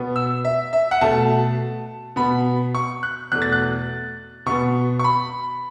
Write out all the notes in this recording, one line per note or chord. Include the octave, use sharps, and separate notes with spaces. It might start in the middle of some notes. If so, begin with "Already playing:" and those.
Already playing: B2 B3
E6
E5
E5
F#5
B2 A3 A5
B2 B3 B5
C#6
F#6
E2 B2 A3 F#6
A6
F#6
B2 B3 C#6
C#6
B5